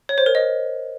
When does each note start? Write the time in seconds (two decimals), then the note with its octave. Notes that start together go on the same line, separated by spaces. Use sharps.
0.09 C#5
0.18 C5
0.26 A#4
0.35 D#5